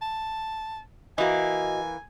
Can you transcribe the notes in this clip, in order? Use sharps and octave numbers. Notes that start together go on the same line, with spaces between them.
A5
E3 A#3 F#4 D#5 G#5